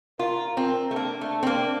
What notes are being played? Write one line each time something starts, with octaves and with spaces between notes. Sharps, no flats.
F4 A#4
C4
A3
A#3 D4
A3
C4
A#3